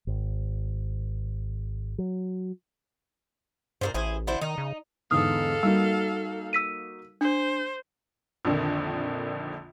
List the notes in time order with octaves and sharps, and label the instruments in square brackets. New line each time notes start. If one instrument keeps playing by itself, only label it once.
[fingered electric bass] G#1
F#3
[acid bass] G2 [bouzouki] A#2 C#3 C5
[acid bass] A1 [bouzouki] E4 G#4 C5
[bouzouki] D3 E4 C5
[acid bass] D#3 [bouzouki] D#4
[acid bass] C#3
[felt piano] E2 G#2 D3 [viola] A4 F5 [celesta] D#6 F6
[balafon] G3 [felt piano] A#3 D#4 F#4
[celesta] E6 B6 D#7
[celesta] D4 [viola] C5
[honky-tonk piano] A#1 F2 D3 D#3